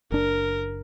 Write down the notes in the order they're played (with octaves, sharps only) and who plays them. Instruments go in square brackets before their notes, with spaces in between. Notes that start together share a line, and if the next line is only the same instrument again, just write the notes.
[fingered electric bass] F#1 D4 [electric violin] A#4